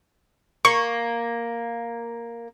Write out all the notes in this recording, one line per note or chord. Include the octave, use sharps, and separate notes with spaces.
A#3 C#6